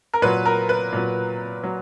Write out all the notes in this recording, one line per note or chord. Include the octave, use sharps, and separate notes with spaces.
A#4
A#2 F#3 B4
A#4
B4
A#2 F#3
F#3